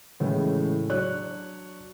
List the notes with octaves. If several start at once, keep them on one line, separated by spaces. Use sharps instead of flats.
A2 C#3 E3 G#3 A3
F#3 D4 C#5 F#6